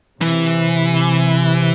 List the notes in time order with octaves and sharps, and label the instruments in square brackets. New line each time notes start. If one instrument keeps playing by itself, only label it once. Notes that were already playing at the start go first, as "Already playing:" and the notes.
[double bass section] C3 [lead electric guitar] E3